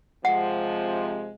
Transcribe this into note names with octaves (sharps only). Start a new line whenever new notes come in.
C3 F3 G#3 F#5